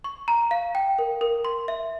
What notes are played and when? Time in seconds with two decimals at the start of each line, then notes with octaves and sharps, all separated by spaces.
0.04 C#6
0.28 A#5
0.51 F5
0.75 G5
0.99 A#4
1.21 A#4
1.45 C6
1.68 E5